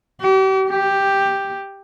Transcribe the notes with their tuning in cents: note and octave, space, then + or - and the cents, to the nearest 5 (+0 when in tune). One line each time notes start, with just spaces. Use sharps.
G4 -40
G4 +5